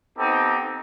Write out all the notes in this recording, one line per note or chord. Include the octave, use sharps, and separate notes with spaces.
B3 C4 D#4 G4 A4